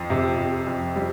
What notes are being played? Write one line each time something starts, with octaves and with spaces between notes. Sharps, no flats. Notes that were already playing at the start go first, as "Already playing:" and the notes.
Already playing: F2
C3
C3
F2
G3